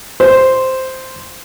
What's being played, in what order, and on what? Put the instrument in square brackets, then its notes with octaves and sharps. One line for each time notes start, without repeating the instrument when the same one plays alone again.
[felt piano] C5